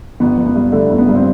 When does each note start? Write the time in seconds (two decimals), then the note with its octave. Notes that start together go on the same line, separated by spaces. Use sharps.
0.20 G1 B3
0.38 G1
0.46 B3
0.55 G2
0.72 D3 A3
0.90 G1
0.98 B3
1.08 G2
1.15 C4